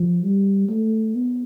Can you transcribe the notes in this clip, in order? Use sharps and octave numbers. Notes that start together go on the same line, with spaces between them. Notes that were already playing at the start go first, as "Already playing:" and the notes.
Already playing: F3
G3
A3
B3